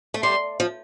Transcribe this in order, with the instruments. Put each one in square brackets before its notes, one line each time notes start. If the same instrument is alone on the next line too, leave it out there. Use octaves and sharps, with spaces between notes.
[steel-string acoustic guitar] A3
[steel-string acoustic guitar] G3 [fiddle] C6
[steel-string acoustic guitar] F3